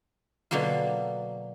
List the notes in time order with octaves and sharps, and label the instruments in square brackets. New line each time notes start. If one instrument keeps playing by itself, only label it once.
[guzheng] B2 D3 F#3 A#3 F4